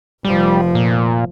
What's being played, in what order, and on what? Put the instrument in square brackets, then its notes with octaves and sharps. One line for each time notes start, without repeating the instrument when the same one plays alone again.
[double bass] F1 F3 [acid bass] G3
[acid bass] A#2